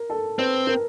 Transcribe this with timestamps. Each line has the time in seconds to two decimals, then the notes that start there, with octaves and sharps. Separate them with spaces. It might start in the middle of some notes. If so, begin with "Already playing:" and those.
Already playing: A#4
0.10 A4
0.39 C4 B4
0.67 A#4